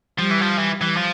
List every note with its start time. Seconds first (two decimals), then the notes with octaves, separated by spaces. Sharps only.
0.19 F3 G3
0.31 E3
0.41 F3
0.58 E3
0.81 E3
0.97 F3